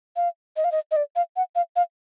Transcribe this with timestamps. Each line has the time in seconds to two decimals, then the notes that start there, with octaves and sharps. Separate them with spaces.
0.16 F5
0.56 D#5
0.64 F5
0.72 D#5
0.91 D#5
0.96 D5
1.16 F5
1.36 F#5
1.55 F5
1.76 F5